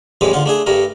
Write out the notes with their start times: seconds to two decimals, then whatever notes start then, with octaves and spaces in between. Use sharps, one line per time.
0.21 A1 F2 A2 E3 G3 G#3
0.33 D3 F4 F#5
0.46 A3 D4 G#4
0.66 G2 G3 A3 A#4